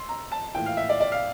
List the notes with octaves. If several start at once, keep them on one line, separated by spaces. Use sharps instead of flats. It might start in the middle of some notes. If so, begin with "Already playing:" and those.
Already playing: C6 E6
A#5
A5
A2 E3 A#3 F4 G5
F5
E5
D5
D5
F5